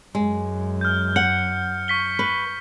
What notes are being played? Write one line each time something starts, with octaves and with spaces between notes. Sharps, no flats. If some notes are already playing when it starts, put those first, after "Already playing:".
F#2 G#3
F6 G6
F#5 C#7
C#6 B6 G7
B4